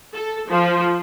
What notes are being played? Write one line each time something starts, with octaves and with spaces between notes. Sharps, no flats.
A4
F3